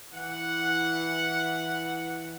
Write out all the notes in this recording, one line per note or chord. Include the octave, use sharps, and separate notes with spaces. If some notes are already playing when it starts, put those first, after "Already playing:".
E3 F#5